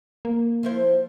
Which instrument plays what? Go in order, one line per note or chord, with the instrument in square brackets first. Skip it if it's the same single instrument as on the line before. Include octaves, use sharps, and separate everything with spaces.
[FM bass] A#3
[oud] F3 E4 C5